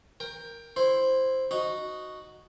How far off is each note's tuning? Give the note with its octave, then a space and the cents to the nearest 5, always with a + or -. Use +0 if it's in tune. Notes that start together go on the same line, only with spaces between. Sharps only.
A#4 +0 G5 +15
E4 +0 C5 +0
D#4 +0 F#4 +0